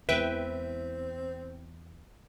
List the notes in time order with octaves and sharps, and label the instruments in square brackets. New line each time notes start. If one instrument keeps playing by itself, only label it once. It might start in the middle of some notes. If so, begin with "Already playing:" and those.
[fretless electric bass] E2 E3 G#3 [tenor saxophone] C4 [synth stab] B4 E5 G5